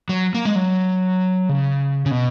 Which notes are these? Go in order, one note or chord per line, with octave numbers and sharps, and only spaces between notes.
F#3
A#3
G#3
F#3
C#3
C#3
B2